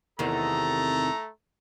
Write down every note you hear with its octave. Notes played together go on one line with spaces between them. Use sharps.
E2 C3 D#3 A3 A4 A#5